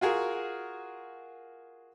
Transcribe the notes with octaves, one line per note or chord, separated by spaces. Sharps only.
F4 F#4 G#4 A#4